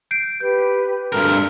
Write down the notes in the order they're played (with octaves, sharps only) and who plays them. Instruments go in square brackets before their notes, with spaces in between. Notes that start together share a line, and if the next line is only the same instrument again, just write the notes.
[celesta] G6 C7 D7
[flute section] G4 B4 [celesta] G6
[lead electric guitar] G2 A#4 [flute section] D4 A4 C6